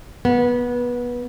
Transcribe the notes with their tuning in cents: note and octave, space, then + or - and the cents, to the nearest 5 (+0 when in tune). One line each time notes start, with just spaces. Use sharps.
B3 -20